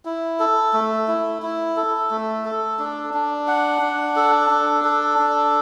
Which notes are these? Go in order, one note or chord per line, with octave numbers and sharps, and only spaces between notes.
E4
A4
A3
E4
E4
A4
A3
A4
D4
D4
F#5
D4
A4
D4
A4
D4